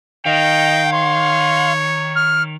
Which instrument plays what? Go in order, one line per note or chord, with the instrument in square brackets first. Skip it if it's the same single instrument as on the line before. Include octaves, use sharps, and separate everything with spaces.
[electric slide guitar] D#3 [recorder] D#5 [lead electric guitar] F5 [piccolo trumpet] G5
[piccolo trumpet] C#5 [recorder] C6
[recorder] F6